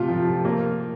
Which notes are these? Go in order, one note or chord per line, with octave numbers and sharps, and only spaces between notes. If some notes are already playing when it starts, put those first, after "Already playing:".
Already playing: C3 A3 F4
F3
A#3